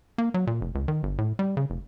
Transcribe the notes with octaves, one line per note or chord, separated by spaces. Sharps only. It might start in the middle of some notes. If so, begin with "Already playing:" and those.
A#3
F#3
A#2
F1
C#2
D#3
G1
A2
G3
C#3
F1